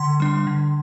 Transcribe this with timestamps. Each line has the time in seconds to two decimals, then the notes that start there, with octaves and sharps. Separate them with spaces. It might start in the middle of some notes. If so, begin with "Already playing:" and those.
Already playing: D3 C6
0.20 G3 D4
0.47 D3